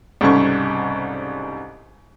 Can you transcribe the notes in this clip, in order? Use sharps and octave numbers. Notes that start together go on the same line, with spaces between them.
C2 G#2 C#3 G3 A4 C#6